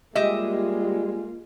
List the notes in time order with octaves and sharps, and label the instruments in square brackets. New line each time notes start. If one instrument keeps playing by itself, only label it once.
[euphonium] G3 [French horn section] G#3 [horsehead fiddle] A#3 F4 [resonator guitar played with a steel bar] G4 D#5 E5